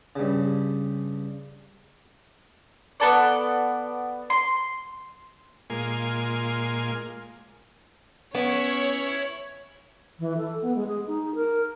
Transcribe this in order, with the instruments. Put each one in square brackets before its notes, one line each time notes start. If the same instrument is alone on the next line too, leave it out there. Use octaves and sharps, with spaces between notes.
[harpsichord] G2 C#3
[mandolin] B3 A4 D5
C6
[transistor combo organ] A#2 G#3 A#3 F4 G#5 C6
[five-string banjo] B3 [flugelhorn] C#4 [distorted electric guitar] E4 [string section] C#5
[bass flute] E3
A4
B3
G#3
G#4
D#4
A#4